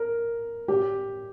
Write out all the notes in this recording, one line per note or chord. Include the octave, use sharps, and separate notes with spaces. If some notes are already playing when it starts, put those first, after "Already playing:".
Already playing: A#4
G4